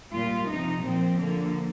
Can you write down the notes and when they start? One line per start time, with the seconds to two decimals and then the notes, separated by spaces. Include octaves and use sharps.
0.14 A#2 G3 F4
0.49 C3 F3 D#4
0.85 A#2 F3 C4
1.19 D3 F3 A#3